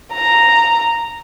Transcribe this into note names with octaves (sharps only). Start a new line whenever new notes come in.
A#5